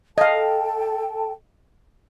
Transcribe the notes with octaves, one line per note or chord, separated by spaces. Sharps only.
A4 D#5 F5 G5 A5